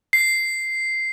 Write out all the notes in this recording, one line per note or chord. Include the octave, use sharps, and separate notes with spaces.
C7